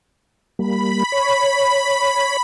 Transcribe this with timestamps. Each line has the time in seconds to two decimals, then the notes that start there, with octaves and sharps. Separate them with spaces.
0.59 G3 A#3 B5
1.12 C#5